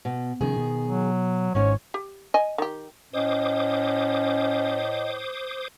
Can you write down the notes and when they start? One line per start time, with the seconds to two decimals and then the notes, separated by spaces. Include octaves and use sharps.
0.05 B2
0.41 C3 D#3 F3 C#4 G#4
0.56 B2 B3
0.87 F#3
1.55 G#1 G#2 C#4 C#5
1.94 G4
2.34 D#5 G#5
2.58 D#3 G4
3.13 A2 C#4 C5 D#5 D6 D#6